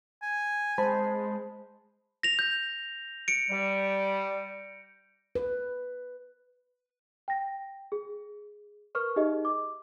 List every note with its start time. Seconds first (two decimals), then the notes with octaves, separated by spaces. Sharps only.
0.22 G#5
0.78 G#3 C5 A5 B5
2.23 A#6 F7
2.39 G6
3.28 C#7 D7
3.50 G3
5.35 B4
7.28 G5 A#6
7.92 G#4
8.95 A#4 B4 C#6 F6
9.16 D#4 G4 G#4 D#5 E5
9.45 D6